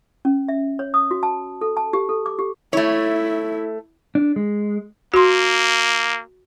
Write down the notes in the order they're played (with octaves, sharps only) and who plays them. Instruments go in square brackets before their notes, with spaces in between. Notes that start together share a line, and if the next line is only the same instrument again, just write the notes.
[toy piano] C#4
E5
C#5
D#6
F#4
A5
A4
A5
G4
A4
D6
G4
[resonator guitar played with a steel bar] A3 C#5 [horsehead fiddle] E4
[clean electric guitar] D4
G#3
[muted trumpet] A#3 [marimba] F#4 C6